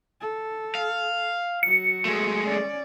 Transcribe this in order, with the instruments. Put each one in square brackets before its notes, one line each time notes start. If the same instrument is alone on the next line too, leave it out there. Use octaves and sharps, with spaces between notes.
[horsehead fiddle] A4
[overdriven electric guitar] F5
[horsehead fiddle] F#3 F#4 [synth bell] C#7
[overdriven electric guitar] G#3 A3
[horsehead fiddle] C#4 D5